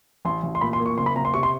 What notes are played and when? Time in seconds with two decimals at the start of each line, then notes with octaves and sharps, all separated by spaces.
0.25 A1 C6
0.43 A1
0.55 C6
0.61 A#2 B5
0.73 C6
0.80 A#3
0.86 C#6
0.98 F#1 C6
1.06 B5
1.16 F#1 A#5
1.25 C6
1.34 C3 C#6
1.43 C6